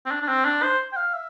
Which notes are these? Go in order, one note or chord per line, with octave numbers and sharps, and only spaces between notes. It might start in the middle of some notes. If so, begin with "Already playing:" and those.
C4
D4
D4
C4
D4
C5
G5
F5
E5